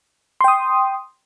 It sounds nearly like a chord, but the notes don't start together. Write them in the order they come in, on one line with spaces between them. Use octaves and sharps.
C6 G5 D#6